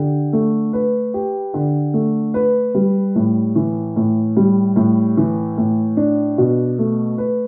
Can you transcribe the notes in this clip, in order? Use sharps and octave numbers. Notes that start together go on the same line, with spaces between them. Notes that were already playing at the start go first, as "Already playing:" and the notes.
Already playing: D3 G4
A3
B4
G4
D3
A3
B4
G3
A2
E3
A2
G3
A2
E3
A2
D4
B2
A3
B4